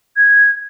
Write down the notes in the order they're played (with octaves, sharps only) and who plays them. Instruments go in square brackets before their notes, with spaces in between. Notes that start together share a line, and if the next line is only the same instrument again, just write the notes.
[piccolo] G#6